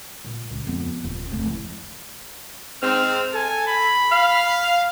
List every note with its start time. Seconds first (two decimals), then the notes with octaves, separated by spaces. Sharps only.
0.25 A#2
0.51 C#2
0.67 F2 B3
1.04 D#1
1.32 F1 A3
1.47 E3
2.82 G#2 C4 F6
3.34 A4 G#5
3.68 B5
4.11 F5